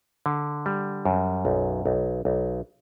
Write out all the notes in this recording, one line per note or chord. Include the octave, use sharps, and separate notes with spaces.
D3
G3
F#2
B1
B1
B1